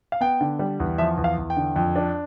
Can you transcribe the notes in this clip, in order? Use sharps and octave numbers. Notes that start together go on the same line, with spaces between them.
F5
B3 G5
D3
G3
E2
F3 E5
E2
F5
E2
G5
D3
F2
D4